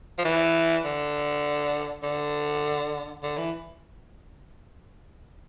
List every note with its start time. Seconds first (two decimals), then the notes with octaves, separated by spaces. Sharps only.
0.18 F3
0.25 E3
0.85 D3
2.03 D3
3.23 D3
3.38 E3